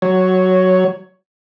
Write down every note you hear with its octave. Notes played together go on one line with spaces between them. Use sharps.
F#3 C#5